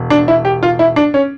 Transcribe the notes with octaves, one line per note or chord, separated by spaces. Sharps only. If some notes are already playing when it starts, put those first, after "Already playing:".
Already playing: E1
D4
E4
G4
F4
E4
D4
C#4